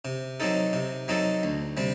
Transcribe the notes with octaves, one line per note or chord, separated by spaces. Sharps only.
C3
F#3 C4 D#4 A4
C3
F#3 C4 D#4 A4
D2
C3 G3 C4